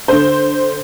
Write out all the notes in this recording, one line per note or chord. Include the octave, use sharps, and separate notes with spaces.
D3 C5